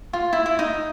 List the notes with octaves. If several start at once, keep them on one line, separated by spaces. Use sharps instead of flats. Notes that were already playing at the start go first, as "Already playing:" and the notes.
F4
E4
E4
D#4